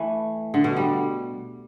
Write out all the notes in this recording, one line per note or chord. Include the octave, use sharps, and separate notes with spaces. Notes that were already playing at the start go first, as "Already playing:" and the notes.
Already playing: E3 A3
D3
B2
G3